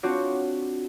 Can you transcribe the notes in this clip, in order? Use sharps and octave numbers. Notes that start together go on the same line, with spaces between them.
C4 D4 F4 F#4 C#5 D5